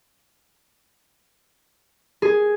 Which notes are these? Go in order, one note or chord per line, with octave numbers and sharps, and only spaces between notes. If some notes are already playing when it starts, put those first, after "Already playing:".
G#4